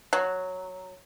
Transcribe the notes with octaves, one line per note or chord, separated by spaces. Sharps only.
F#3